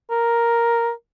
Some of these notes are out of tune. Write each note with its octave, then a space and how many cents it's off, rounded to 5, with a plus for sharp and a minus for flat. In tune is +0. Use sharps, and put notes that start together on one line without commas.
A#4 +5